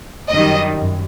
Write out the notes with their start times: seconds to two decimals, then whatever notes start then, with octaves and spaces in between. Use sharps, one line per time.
0.30 F#2 D#3 G3 D#5
0.77 F#2